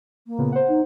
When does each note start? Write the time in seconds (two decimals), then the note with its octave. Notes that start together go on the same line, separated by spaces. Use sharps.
0.27 A#3
0.38 A#2 C#3 B3
0.52 C5 F#5
0.68 D#4